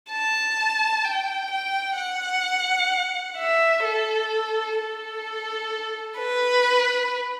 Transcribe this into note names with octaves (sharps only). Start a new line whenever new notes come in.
A5
G5
G5
F#5
E5
A4
A4
B4